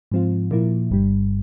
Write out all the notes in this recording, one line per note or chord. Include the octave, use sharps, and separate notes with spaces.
G#2 F3 C4 F4
A#2 F3 A#3 E4
G1 G2 G3